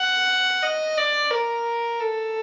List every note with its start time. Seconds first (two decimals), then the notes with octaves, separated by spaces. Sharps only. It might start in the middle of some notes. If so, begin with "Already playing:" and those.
Already playing: F#5
0.63 D#5
0.97 D5
1.31 A#4
2.00 A4